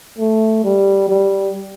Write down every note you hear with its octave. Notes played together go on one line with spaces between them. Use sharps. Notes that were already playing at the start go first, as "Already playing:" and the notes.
A3
G3
G3